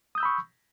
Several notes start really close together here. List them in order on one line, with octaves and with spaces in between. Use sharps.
D#6 G6 E6 B5 C#6